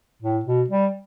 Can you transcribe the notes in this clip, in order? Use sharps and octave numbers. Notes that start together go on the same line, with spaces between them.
A2
B2
G3